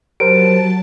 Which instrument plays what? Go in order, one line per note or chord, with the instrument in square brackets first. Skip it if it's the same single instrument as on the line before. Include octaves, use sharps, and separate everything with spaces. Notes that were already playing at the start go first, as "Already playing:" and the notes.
[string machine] F#3 A5 [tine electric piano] G4 A#4 C5 [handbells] D7